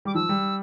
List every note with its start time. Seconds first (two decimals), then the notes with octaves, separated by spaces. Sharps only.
0.05 G3 D6
0.15 F3 E6
0.29 G3